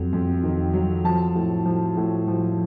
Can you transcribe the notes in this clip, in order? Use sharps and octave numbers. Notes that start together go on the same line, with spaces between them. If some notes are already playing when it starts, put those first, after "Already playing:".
Already playing: F2 F#3
F2
D#3
F#3
F3 A5
A2
F3
A2
F3